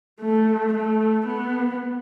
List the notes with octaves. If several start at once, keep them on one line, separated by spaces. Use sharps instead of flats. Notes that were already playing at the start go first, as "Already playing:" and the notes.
A3
A3
B3